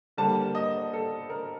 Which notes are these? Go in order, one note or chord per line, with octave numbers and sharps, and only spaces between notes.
D3 G3 A#3 A5
D#5
A4
A#4